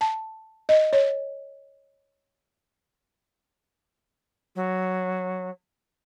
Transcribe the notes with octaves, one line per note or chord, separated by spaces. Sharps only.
A5
D#5
C#5
F#3